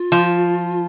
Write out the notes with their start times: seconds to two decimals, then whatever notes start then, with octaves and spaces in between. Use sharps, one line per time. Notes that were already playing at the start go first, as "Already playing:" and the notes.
Already playing: F4
0.12 F3